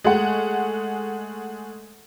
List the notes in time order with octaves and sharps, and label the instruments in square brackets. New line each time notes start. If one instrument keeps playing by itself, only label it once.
[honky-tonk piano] G#3 A3 F#5